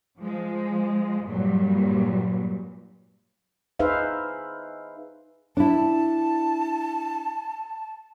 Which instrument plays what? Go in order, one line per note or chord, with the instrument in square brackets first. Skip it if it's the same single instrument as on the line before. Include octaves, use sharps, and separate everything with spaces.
[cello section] F3 G#3
G2 A#2 F#3 G3
[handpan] D#4 G#4 B4 C5 E5 F5
[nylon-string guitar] D4 E4 [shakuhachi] A5